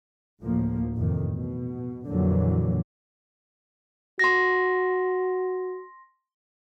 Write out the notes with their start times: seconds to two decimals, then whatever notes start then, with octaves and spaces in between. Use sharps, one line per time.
0.41 D2 A2 F3 A#3
0.96 A1 F2 A2 C3 D#3
1.29 B2
2.07 F2 A#2 D3 E3 F#3 A#3
4.19 F#4 C6 A#6